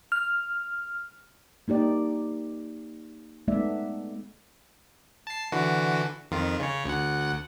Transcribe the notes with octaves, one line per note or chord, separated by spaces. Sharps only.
F6
A#3 D#4 G4 D5
G#3 A3 B3 D#4 D5 E5
A5 C7
D3 E3 F#4
F2 D#3 F4
C#3 C#5
D2 F#5